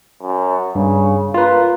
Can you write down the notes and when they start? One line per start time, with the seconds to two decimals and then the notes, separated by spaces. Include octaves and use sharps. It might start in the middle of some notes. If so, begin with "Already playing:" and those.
0.22 F#2
0.75 G2 C#3
1.34 A#3 F4 B4